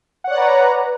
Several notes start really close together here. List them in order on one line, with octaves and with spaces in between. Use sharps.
F#5 C#5 D5 B4 A#5